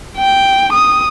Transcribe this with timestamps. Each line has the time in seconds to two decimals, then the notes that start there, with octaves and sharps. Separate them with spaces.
0.17 G5
0.73 D#6